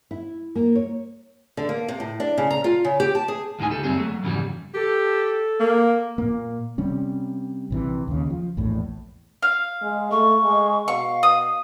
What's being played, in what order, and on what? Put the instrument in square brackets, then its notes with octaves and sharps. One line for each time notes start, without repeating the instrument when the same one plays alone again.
[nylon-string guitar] E4
A#3
C#5
[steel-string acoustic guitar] D3
A#3
C3
A2
D4
C#3
A#5
F4
C#3
G4
A5
G#4
[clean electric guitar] D2 A2 G#3 D#4 G#5
C#2 G4 A4
F#2 B2 G3 C4 G#4
F#3 A3
F2 G#2 C#3 E3 F#3 G3
[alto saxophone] G4 [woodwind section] A4
[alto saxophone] A#3
[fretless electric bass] A#2 A#3
C3 G3 C#4
A#1 C3 E3
D#2 C#3
F3
A#1 E2 A2
[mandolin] F5
[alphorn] G#3
[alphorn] A3 [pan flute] C#6
[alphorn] G#3
[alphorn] B2 [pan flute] F5 [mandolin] C#6
[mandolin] D#6